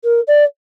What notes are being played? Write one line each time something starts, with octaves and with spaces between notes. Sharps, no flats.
A#4
D5